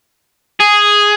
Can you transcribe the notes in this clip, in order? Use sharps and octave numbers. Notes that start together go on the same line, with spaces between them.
G#4